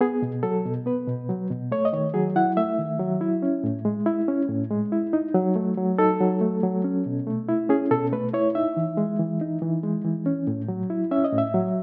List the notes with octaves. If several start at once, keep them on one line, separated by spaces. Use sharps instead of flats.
B3 G#4
B2
F#3 A4
B2
B3 B4
B2
F#3
B2
A3 C#5
D#5
D#3 C#5
F#3 G#4
E4 F#5
A3 E5
D#3
F#3
E4
C#4
A2
G#3
E4
C#4
A2
G#3
E4
D#4
F#3
A3
F#3
D#4 A4
F#3
A3
F#3
C#4
B2
A3
E4
C#4 G#4
B2 A4
A3 B4
E4 C#5
D#4 E5
E3
G#3
E3
D#4
E3
G#3
E3
C#4
A2
F#3
E4
C#4 E5
D#5
A2
E5
F#3